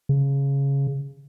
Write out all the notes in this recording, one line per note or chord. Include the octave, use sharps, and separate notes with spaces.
C#3